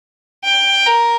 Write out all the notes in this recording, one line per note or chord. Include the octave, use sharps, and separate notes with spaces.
G5
A#4